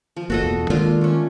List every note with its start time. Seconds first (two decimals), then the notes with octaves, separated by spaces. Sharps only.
0.16 F3
0.30 G1 A#3 F#4 A4 D#5
0.42 E1 E2
0.70 D#3 G#3 A#3 D4 F4
1.01 A3 C#4